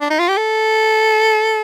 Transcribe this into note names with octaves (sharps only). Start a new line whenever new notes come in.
D4
D#4
F4
G4
A4